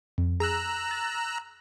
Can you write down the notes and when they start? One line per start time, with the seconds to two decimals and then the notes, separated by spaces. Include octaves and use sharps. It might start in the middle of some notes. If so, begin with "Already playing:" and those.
0.18 F2
0.40 G#4 A#5 E6 F#6
0.91 A6